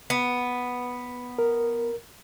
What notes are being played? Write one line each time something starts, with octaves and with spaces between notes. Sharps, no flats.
B3
A#4